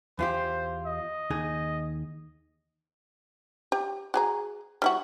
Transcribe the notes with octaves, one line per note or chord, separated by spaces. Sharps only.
E2 F4 G4 C5
D#5
D#2 D#4 G#4
G4
F#4 G#4 A#5
G3 E4 F#4